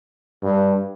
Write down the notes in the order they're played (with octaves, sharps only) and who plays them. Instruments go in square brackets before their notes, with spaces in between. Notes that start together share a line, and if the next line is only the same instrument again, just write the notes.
[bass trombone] G2